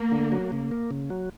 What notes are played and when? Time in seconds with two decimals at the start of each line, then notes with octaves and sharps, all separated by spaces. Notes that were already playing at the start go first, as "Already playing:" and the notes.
Already playing: A#3
0.12 D3
0.32 F#3
0.52 C#3
0.71 A#3
0.91 C#3
1.10 F#3